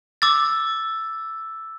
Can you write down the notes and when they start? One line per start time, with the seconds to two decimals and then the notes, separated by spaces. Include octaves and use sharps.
0.22 D6 E6 A6